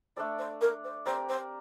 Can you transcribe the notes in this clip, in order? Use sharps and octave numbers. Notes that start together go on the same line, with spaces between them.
A3 D4 A4 C5 D5
C5
A#4
C5
C4 G4 A#4 C5 D5
C5